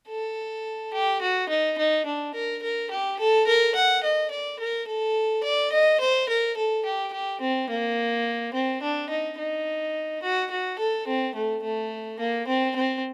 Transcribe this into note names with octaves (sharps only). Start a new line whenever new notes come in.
A4
G4
F#4
D#4
D#4
D4
A#4
A#4
G4
A4
A#4
F#5
D#5
D5
A#4
A4
D5
D#5
C5
A#4
A4
G4
G4
C4
A#3
C4
D4
D#4
D#4
F#4
F#4
A4
C4
A3
A3
A#3
C4
C4